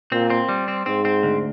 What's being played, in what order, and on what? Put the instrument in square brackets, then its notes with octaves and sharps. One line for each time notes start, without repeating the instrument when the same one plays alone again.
[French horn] A#2 [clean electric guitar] C4
[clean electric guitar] C4
G3
C4
[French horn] G#2 [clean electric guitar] C4
[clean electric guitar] C4
D2